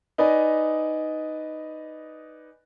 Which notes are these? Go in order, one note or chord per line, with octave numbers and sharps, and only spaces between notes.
D#4 B4 D5 D#5 G#5